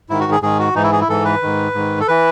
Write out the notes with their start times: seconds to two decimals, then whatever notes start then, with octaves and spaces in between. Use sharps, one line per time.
0.10 G#2 D#3 E4
0.20 F#4
0.32 G#4
0.42 G#2 D#3 G#4
0.60 F#4
0.75 G#2 E3 D#4
0.83 E4
0.92 G#4
1.01 E4
1.09 G#2 E3 A4
1.25 B4
1.42 G#2 D#3
1.74 G#2 D#3
2.01 A4
2.08 E3 B4